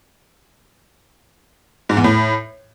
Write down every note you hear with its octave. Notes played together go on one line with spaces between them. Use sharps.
G#2
E2
A2